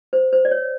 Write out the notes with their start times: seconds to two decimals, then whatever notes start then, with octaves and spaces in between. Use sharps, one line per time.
0.13 C5
0.33 C5
0.45 D5
0.51 C#5